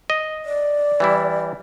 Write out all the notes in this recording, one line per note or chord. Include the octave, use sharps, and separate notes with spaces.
D#5
D5
E3 G3 E4